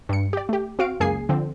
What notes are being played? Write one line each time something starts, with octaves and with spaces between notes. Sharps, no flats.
G2 C#7
G4 D5
A3 G4
C4 F#4 F5 D7
C#2 F#2 A#3 G#4 G#5 C7
D3 F3 C4